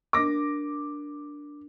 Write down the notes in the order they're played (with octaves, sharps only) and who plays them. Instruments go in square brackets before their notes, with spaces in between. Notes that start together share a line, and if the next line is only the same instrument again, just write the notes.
[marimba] D4 A#4 [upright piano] D6 A#6